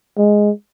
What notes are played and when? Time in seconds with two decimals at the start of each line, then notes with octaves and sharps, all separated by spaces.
0.18 G#3